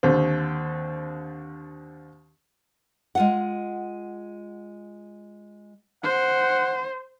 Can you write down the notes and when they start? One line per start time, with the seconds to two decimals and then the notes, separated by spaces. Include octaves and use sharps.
0.03 D#2 D3 C4
3.15 G#3 F4 F#5
6.03 C5 F#5